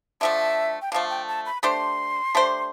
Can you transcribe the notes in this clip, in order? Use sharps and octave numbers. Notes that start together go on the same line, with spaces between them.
D3 F3 A3 E5
G5
D3 F3 A3 F5
G5
A5
B5
A3 D4 G4 C5 C6
A3 D4 G4 C5